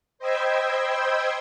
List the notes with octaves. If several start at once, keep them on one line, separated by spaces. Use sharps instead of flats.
C5 D#5 G5 B5 E6 G#6